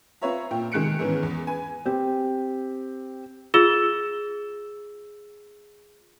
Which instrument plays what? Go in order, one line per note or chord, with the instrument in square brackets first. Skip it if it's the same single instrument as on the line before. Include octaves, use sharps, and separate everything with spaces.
[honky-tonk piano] C4 F4 B4 C#5 E5 A#5
A#2 G5
C3 D#3 G#3 F#6 C#7 D7
G#2 D#3 E3 B3 C#4
E2
B4 G#5
[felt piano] C4 G4
[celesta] F4 G#4 E6 A6 E7 G7